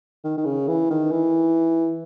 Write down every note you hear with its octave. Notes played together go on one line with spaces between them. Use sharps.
D#3
D#3
C#3
E3
D#3
E3